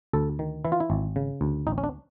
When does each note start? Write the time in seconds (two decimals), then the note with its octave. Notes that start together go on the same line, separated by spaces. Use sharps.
0.13 D2 A4
0.39 D#3
0.65 E3 E4
0.72 F4
0.80 E4
0.90 G#1
1.16 C#3
1.41 D2
1.67 A1 D#4
1.78 C#4
1.84 D4